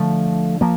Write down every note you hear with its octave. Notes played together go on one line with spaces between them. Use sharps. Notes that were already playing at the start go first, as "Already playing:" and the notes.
Already playing: D3 F3 A3
F3 A#3